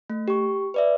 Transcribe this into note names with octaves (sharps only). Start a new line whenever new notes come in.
A3
G4 C#6
B4 D5 E5